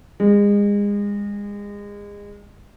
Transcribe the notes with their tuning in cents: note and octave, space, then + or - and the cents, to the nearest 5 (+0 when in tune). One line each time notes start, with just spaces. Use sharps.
G#3 -30